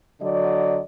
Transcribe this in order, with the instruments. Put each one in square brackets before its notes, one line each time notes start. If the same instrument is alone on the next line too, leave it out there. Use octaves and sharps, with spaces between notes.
[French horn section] D3 F#3 D5 D#5